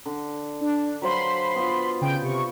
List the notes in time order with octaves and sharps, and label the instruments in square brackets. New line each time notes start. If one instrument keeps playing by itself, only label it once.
[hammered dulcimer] D3
[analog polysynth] D4
[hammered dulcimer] F#3 C5 F5 [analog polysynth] B5 C6
[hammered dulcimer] B3 F4
[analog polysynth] C#3 G5 D7
C3 C#6